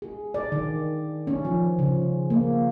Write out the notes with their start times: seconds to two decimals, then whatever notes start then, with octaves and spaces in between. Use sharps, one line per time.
0.02 G#4
0.34 D5
0.52 D#3
1.27 C#4
1.45 F3
1.79 C#3
2.30 A#3